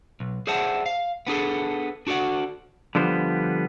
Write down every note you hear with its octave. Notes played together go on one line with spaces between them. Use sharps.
B1
G#4 C5 D5 E5 F#5 A5
F5
B3 D4 G#4 A4
D4 F#4 A4 D5 F#5
D3 F3 G3 B3 C5